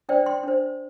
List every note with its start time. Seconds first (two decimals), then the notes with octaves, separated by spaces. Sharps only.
0.09 D4 C5 D5 G5
0.26 G5 C6
0.43 D4 C5